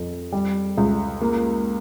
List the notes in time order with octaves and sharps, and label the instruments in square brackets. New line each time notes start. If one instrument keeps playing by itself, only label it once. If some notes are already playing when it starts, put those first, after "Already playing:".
Already playing: [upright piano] F2
G3
C#2
A#3